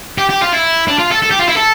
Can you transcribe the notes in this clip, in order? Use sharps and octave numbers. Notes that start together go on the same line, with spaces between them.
G4
G4
F4
E4
D4
F4
A4
A4
G4
F4
E4
A4